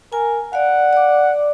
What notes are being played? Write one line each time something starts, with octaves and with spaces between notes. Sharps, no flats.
A#4 G#5
D5 F5 F#5
D5 D6